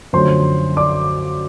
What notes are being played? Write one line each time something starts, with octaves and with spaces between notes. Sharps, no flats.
F#2 D3 F3 A3 C#4 C5 C6
D5 D6